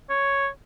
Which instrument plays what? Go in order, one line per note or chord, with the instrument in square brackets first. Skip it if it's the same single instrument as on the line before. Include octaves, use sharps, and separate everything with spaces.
[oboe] C#5